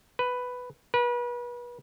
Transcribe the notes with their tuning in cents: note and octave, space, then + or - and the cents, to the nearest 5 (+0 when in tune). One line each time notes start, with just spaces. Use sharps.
B4 +5
B4 -35